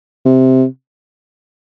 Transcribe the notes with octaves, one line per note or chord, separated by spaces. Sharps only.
C3